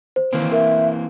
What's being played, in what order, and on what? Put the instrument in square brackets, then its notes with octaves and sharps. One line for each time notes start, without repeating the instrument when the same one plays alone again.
[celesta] C5
[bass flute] D#3 [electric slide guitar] E3 A#3 C4
[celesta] A#4 [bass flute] E5